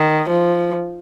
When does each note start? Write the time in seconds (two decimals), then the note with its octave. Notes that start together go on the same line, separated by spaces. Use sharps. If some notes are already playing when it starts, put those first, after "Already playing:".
Already playing: D#3
0.30 F3